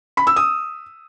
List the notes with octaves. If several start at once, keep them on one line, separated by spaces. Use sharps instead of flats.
B5
E6
D#6